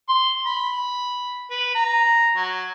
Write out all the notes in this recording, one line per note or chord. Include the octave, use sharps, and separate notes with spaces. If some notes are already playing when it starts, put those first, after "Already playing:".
C6
B5
B4
A#5
F#3